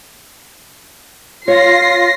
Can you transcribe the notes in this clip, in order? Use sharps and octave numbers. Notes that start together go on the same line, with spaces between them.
F4 C#5 A#6 C7